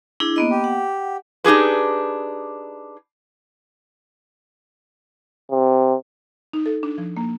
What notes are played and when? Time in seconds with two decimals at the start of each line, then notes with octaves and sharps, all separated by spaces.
0.20 D4 E4 G#4
0.36 A#3 B3 D#5
0.50 G4
0.64 F#5
1.44 D4 D#4 G4 G#4 B4
5.51 C3
6.53 D#4
6.66 A4
6.83 D4
6.98 F3
7.17 A#3